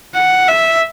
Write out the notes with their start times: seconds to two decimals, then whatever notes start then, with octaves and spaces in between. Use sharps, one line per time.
0.14 F#5
0.48 E5